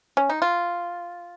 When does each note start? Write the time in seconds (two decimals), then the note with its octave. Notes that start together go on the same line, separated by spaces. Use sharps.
0.17 C#4
0.30 D#4
0.42 F4